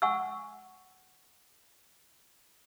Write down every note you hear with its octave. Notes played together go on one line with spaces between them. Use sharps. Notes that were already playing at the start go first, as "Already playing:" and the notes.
F#5 G#5 C#6 E6